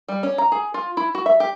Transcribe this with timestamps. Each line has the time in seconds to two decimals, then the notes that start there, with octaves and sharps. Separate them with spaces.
0.08 G3
0.23 C#4
0.38 A#5
0.52 G#4
0.74 F4
0.97 E4
1.15 F#4
1.26 E5
1.40 G4